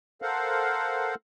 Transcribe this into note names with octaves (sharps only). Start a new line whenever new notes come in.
A4 A#4 C5 F5 F#5